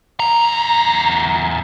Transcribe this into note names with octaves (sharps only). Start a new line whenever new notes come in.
E2 A#5